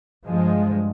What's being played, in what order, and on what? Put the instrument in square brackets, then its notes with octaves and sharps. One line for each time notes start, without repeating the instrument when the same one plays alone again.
[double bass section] G2 F3 G#3